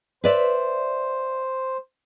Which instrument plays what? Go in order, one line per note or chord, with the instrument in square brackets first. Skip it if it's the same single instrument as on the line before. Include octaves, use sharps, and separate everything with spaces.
[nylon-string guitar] B4 D5 E5 [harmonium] C5